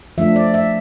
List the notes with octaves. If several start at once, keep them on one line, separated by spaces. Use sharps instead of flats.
F3 A3 D4 E5
D5
E5